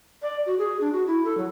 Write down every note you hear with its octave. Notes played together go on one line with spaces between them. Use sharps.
D5
F#4
G#4
D4
F#4
E4
A4
F#3